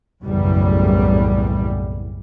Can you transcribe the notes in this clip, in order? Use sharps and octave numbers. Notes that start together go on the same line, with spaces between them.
F#1 B1 E2 A2 G3